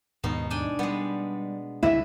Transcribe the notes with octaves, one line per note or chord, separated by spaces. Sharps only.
D#2 G#2 B2 B3 D#4
D4 G5 G#5
G3 G#3 B3
C#2 G2 D3 E4 B4 E5